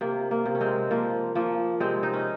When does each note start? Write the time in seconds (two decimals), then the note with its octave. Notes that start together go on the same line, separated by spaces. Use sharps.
0.01 C3 A#3
0.31 A#3
0.46 C3
0.55 C#4
0.61 G#3 C4
0.91 F3 A#3
1.35 F3 A#3
1.80 C3 G#3 C4
2.03 D#4
2.14 C#4